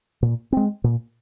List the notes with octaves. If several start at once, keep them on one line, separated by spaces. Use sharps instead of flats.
A#2
G#3 C4
A#2